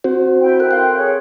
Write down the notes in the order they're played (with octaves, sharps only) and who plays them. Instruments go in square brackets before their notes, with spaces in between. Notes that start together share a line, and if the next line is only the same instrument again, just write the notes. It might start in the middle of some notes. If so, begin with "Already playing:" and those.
[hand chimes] C4 F#4 C5
[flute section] E4 G5
[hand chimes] A4 A#4 F#6
[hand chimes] F5 F#6 [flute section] G5 C6
[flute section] G#4 C#5